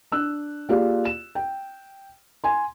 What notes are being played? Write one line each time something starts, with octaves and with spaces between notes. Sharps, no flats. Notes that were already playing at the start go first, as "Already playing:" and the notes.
D4 E6 F#6
A#3 F4 G4 G#4 D5 F5
E7
G5
G#5 C6